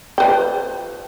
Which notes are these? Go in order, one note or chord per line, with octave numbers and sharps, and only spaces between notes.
F3 B4 G5